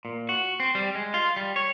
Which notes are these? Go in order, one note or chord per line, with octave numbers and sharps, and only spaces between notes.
A#2
F#4
C4
G3
G#3
F4
G3
C#5